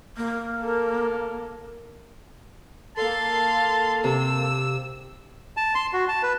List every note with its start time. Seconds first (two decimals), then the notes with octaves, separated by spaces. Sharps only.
0.17 A#3
0.60 A4 A#4
2.97 A#3 A4 F5 A5 C6
4.04 C3 E6
5.57 A5
5.75 C6
5.93 F#4
6.08 A5
6.23 B4